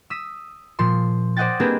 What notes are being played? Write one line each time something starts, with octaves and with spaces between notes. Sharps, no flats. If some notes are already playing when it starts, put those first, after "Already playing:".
D#6 E6 B6
A#2 F3 C6
C5 D5 D#5 F#5 G5 A6
A#3 C4 D4 G4 G#4 B4